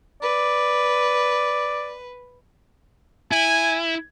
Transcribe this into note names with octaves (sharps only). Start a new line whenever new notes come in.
B4 D5
E4 G#5